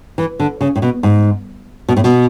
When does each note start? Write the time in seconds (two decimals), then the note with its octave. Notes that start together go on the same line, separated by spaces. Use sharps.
0.18 E3
0.40 D3
0.61 C#3
0.76 A2
0.82 B2
1.03 G#2
1.89 B2
1.97 A2
2.04 B2